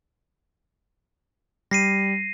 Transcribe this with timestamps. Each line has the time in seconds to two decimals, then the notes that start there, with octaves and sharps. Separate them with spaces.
1.71 G3 A#6 C7 D#7